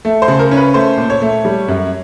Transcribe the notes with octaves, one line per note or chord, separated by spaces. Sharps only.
A3
C5
C#3
A#4
C#4
B4
A3 C5
A#2
C#5
A3
G3
F#2